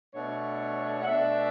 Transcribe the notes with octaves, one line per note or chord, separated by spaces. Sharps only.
B2 A3 D4 C#5
F#5
B2 A3 D4 E5